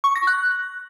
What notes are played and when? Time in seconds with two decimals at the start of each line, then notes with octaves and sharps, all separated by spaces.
0.04 C#6
0.16 A#6
0.27 F#6